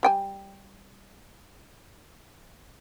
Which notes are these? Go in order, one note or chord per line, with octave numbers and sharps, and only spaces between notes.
G3 G5 G#5